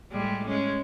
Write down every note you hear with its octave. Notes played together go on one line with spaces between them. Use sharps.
A2 G3 G#3
G#3 C#4